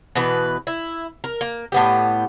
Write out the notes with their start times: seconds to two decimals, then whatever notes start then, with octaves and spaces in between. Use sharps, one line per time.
0.15 B2 E3 B4
0.67 E4
1.24 A#4
1.41 A#3
1.72 A2 B3 G4